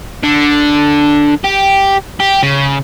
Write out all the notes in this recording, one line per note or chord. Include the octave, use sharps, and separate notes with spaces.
D3
G4
G4
C#3